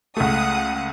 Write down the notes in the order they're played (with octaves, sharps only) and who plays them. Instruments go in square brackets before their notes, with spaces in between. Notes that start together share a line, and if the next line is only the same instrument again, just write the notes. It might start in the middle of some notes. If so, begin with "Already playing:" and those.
[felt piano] C#2 A3 [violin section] F#5 D#6